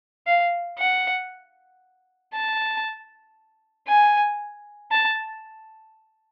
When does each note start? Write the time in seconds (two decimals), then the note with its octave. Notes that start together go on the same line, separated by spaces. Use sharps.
0.27 F5
0.78 F#5
2.33 A5
3.88 G#5
4.91 A5